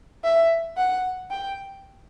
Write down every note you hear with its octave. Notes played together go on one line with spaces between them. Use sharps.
E5
F#5
G5